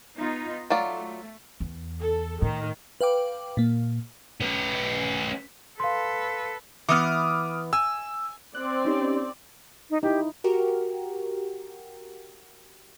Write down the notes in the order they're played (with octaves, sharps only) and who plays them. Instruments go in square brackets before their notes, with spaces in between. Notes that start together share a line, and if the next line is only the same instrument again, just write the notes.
[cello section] B3 D#4 F4
[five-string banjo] F#3 F4 D5 [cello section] A3
[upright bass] E2
[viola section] A4
[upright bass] A2 [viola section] D#3
[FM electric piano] B4 F5 G5 D6
A#2 A#3
[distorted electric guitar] C#4 B4
[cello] A4 B4 [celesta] F5 C6
[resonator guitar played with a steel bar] E3 B3 [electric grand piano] D6 D#6 F6
[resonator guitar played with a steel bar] G#5 [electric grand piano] E6
[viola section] C4 D5 [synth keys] F#6
[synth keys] C#4 D#4 G4
[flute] D#4
[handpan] D#4 E4 [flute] G4
[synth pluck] F#4 G4 A#4